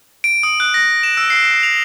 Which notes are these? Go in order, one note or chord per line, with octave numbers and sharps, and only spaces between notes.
D7
D#6
F#6
A#6
E7
E6
C7
E7
F7